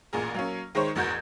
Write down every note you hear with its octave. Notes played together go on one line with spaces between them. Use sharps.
A1 A#2 G#4 A#4
F#3 A#3 C#4
D#3 G#3 D#4 C5 C#5
A1 E2 F#4 A#4 G6 G#6